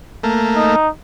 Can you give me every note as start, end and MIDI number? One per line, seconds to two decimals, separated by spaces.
0.23 0.76 57
0.23 0.76 58
0.57 0.89 63